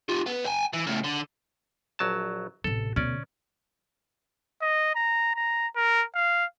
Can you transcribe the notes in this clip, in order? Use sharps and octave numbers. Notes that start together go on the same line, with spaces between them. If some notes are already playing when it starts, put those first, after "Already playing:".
F4 G4
B3 B4
G5 G#5
E3
A2 C#3
D3
A#1 F#3 A5
A1 C3 A4
D2 B2 C#4 D5
D#5
A#5
A#5
A#4
F5